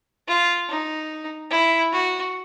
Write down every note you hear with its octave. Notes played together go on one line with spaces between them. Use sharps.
F4
D#4
E4
F#4